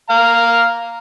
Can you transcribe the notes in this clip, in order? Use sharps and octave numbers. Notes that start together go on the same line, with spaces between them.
F5 A#5